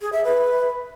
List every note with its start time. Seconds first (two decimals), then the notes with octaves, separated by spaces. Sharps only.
0.01 G#4
0.12 E5
0.24 B4